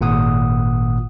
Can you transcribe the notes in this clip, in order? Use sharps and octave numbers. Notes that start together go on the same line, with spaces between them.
G#1 A#2 F#5 D#6